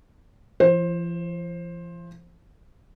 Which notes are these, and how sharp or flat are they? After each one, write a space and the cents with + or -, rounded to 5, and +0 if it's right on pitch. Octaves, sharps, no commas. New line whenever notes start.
F3 -40 C5 +20